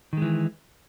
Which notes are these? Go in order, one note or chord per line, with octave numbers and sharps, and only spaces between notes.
D#3 E3 G#3